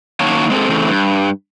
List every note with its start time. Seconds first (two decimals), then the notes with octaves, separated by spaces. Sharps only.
0.20 F#2 D#3 F#3 A#3 C#5 A5
0.50 G#3 C4 G#4 A4
0.69 C#3 E3 A3 C4
0.89 G2